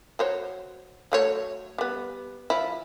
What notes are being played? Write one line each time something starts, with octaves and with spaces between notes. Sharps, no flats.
F#3 C5 C#5
F#3 A3 C#5
G3 B3
F3 E4